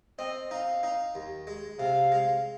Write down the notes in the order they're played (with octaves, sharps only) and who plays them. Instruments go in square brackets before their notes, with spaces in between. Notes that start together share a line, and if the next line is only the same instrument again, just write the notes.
[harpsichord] C4 [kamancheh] D#5
[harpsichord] D#4 [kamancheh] F5
[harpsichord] D#4
D#2
G#3
[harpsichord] C3 [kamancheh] F5
[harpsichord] G#3